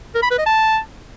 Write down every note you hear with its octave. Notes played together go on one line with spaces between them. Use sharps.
A#4
B5
B4
D#5
A5